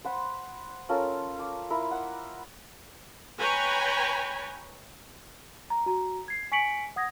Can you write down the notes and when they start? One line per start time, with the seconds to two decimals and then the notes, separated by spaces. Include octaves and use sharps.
0.05 C5 F#5 B5
0.89 C#4 F4 A4 A#4
1.39 D6
1.70 E4 A#4 B5 C6
1.91 F#5
3.40 B4 C#5 G5 G#5 A#5 B5
5.70 A#5
5.86 F#4 A#5
6.28 G#6 C7
6.52 G#5 C#6 B6 C#7 D7 F#7
6.96 F#5 D#6 G#6 A#6